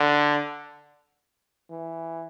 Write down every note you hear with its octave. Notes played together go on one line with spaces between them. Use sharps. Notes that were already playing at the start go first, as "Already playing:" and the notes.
Already playing: D3
E3